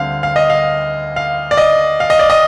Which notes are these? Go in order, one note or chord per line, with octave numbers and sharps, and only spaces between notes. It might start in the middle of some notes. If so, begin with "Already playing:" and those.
Already playing: D2 D3 G3 C4 F5
F5
D#5
F5
F5
D5
D#5
F5
D#5
D5
D#5